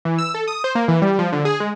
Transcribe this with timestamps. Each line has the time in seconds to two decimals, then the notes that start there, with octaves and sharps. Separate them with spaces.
0.05 E3
0.18 E6
0.34 A4
0.48 D#6
0.64 C5
0.75 A#3
0.88 E3
1.02 G3
1.19 F3
1.32 D3
1.45 G#4
1.60 G#3